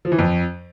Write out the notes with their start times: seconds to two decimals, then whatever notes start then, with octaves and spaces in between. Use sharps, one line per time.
0.05 F3
0.12 E3
0.19 F2